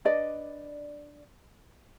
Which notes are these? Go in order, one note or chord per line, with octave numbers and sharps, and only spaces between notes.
D4 B4 D5 D#5